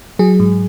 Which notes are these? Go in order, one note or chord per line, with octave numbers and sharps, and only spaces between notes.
F#3 G#4
G#2